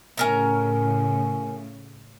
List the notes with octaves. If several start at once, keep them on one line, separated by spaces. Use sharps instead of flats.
A2 C#3 C#4 A#4 A#5